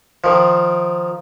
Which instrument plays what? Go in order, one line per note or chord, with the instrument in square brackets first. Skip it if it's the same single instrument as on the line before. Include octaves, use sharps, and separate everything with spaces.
[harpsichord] D#3 F3